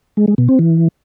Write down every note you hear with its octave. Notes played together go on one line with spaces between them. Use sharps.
G#3
G#3
B2
C4
E3